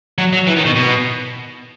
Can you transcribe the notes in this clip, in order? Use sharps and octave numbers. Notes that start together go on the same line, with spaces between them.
F#3
F#3
E3
D#3
B2
B2